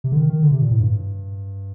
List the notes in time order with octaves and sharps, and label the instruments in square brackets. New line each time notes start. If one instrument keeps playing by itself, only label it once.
[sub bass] C3
D3
D#3
D#3
D3
C3
A#2
A2
G2